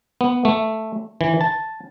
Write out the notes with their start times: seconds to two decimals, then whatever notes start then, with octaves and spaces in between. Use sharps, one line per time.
0.21 B3
0.45 A3
1.21 E3
1.41 A5